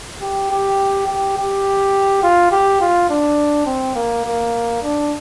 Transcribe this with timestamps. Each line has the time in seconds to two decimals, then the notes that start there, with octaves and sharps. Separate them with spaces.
0.21 G4
0.51 G4
1.08 G4
1.37 G4
2.23 F4
2.52 G4
2.81 F4
3.10 D4
3.66 C4
3.95 A#3
4.25 A#3
4.83 D4